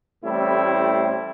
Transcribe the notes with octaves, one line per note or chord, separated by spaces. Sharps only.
A1 A2 G3 C4 E4